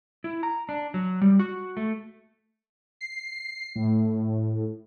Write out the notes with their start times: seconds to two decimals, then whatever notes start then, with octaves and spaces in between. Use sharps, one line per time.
0.24 E4
0.43 A#5
0.69 D4
0.94 F#3
1.21 G3
1.39 F#4
1.77 A3
3.01 C7
3.75 A2